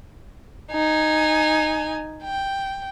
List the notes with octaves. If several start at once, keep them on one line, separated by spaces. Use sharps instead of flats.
D#4 G#5
G5